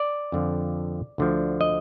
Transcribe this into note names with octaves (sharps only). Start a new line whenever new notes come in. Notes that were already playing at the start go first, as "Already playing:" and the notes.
Already playing: D5
F2 D3 F3
D2 D3 F3
D#5